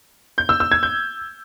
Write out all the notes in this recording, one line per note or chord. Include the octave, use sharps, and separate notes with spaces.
G6
E6
E6
G#6
G6